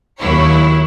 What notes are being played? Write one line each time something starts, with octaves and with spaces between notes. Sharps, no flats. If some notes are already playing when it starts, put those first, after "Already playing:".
D#2 F#3 E4 C#5